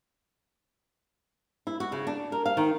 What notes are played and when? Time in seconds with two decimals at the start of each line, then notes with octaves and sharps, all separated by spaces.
1.67 E4
1.80 F#4
1.92 C#3
2.07 D4
2.32 A#4
2.46 F5
2.57 D#3